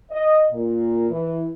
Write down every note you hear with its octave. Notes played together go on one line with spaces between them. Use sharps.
D#5
A#2
E3